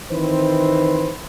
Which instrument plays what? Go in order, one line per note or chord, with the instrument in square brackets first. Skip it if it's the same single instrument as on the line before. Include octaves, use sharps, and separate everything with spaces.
[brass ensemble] D#3 E3 C4 B4 C5